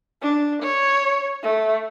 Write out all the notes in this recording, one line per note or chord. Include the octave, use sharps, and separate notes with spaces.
D4
C#5
A3